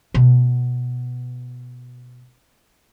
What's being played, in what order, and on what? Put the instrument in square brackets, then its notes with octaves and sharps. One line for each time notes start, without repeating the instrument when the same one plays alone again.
[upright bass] B2 B3